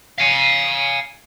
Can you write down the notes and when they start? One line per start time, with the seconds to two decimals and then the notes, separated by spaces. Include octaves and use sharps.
0.18 F5 G#5